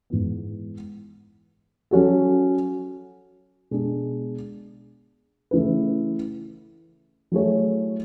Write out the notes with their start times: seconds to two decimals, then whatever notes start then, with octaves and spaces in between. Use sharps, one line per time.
0.10 G#2 E3 B3
1.91 F#3 C#4 F#4 A4
3.71 B2 G#3 D4 G#4
5.51 C#3 E3 A3 E4 B4
7.32 F#3 A3 E4 G#4 C#5